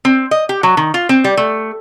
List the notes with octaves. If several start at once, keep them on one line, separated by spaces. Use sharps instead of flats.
C4
D#5
G4
F#3
D#3
F4
C4
G3
A3